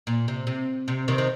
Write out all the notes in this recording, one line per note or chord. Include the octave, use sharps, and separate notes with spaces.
A#2
C3
C3
C3
C3 D#3
D#3